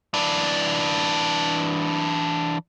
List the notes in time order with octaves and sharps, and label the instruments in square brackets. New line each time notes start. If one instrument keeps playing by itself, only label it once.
[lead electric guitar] E3 D4